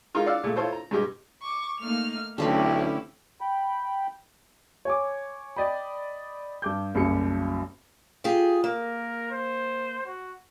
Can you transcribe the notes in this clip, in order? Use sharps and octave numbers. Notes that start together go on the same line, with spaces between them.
G#3 D#4 F4 A#4
D5 F5 F#5 E6 F6
A#2 G#3 A3
E4 F4 A4 C5 C#5
A#5
G2 B2 G#3 G4
C#6 D6
A3 A#3 D#4 F6 F7
B1 D3 A3 C4 C#4 E4 G4 B4
G5 B5
C#5 G#5 D6
D5 D#5 G5 B5
G2 D6 G6
F#1 B1 F#2 G3 C#7
F4 G4 G#4
A#3 A#4
C5
F#4